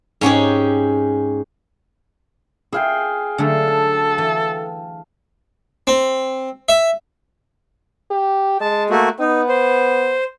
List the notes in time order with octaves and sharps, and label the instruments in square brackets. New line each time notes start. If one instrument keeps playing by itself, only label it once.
[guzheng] G#2 C#4 G4 G#4
[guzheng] E4 [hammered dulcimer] G#4 F5 G5
[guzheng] D3 F#3 A3 [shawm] A4
[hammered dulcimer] A5
[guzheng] E3
[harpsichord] C4
E5
[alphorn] G4
[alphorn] G#3 [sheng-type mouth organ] A5
[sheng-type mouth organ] A3 A#3 F#4
[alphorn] B3 [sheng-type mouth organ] D#4
[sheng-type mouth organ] C5